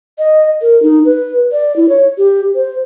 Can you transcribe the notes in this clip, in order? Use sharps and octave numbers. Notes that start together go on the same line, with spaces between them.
D#5
A#4
D#4
B4
D5
E4
C#5
G4
C5